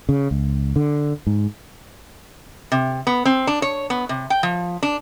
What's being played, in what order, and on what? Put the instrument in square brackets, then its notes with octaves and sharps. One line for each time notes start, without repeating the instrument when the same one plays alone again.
[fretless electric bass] C#3
C#2
D3
G#2
[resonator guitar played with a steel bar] C3
B3
C4
D4
C#5
B3
C3
G5
F3
D4